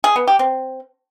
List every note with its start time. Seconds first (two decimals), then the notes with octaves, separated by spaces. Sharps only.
0.04 G#4
0.16 B3
0.28 G4
0.39 C4